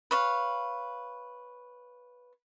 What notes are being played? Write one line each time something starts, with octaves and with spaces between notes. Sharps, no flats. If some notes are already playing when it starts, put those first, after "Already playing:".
B4 C#5 F5